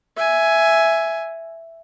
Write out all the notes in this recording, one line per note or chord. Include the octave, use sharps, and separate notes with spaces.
E5 G#5